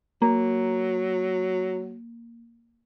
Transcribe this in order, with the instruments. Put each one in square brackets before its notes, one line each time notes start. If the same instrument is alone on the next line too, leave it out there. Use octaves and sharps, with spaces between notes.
[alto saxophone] F#3 [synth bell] A#3